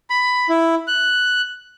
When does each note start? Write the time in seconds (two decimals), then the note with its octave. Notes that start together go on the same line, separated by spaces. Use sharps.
0.10 B5
0.49 E4
0.87 F#6